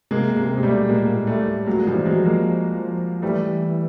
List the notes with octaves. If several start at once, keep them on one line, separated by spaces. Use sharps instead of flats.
C3 G#3 A#3
C3 G#3 A#3
G#3
B2 G3 A3
A#2 G#3 A#3
A2
G3 A3
A2
A#2 F#3 G#3
G#3
F3 G3
E3
F#3 G#3
F3
G#3 A#3
E3 G3 A3